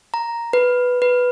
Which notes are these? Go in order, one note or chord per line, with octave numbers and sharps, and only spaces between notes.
A#5
B4
B4